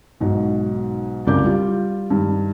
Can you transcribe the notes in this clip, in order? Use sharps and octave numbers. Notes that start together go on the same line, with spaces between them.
B1 G#2 B2
C2 F#2 C#3 D4 D6 G6
G3 F4
G2 D#3